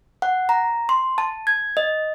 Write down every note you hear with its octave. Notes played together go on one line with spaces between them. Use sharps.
F#5
A#5
C6
A5
G#6
D#5